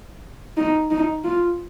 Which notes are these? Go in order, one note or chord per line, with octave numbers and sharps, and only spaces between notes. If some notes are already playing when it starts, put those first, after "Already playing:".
D#4
D#4
F4